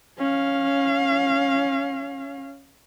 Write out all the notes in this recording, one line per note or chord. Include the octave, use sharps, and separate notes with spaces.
C#4 F5